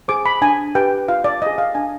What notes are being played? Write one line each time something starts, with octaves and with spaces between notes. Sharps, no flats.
G#4 C5 D6
B5
D4 G#5
G4 B4 G5
F4 F5
D5
G#4 C5 D#5
F5
D4 G#5